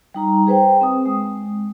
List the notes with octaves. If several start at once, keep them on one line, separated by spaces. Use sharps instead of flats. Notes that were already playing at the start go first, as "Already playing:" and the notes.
G3 D#4 A#5
G#4 B4 C5 G5
C4 D#6
G#3